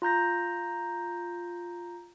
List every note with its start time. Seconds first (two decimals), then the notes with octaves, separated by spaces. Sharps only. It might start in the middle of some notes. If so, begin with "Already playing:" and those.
0.02 F4 A#5 G6 A#6